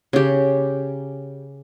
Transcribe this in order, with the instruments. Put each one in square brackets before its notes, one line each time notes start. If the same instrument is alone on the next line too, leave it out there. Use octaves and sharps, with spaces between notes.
[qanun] C#3 G4